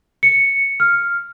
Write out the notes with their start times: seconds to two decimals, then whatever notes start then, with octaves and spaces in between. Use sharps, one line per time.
0.23 C#7
0.80 F6